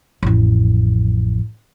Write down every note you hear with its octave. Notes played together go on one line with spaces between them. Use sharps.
A1 F2